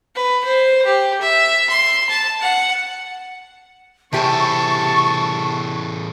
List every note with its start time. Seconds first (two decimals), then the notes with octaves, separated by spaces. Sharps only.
0.15 B4
0.44 C5
0.85 G4
1.21 E5
1.69 C6
2.09 A5
2.41 F#5
4.13 E2 A2 C3 G4 G#5 A5 C#6